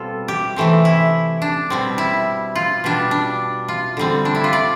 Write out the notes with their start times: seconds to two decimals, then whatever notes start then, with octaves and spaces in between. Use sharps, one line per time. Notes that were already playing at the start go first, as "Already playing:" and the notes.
Already playing: B2 G3 C4 F4 A4
0.28 G4
0.56 C3 E3 A3 C4
0.85 E4
1.42 D4
1.70 B2 G3 C4
1.98 E4
2.55 F4
2.84 B2 G3 D4
3.11 D4
3.68 F4
3.97 D3 G3 C4
4.25 D4
4.35 E4
4.44 F4
4.53 D5